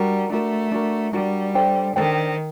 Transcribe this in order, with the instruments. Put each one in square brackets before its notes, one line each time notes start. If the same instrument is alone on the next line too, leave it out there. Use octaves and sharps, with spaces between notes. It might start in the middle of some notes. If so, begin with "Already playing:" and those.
Already playing: [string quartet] G3 [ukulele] D4 F#4 A#4
[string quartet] A3 [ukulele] D4 F#4 A#4
[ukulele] D4 F#4 A#4
[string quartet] G3 [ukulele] D4 F#4 A#4
[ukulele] D4 A4 C5 G5
[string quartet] D#3 [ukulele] D4 A4 C5 G5